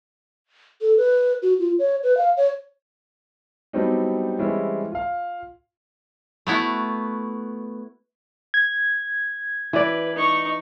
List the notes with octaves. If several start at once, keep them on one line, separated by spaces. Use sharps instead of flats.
A4
B4
F#4
F4
C#5
B4
F5
C#5
F#3 G3 B3 C4 D4 D#4
E3 G3 G#3 C4 C#4 E4
F4 F5
A3 B3 E4 F#4
G#6
E3 B4 D5
D#4 C#6